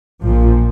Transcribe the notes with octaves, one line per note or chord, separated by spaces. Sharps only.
A#1 A#2 F3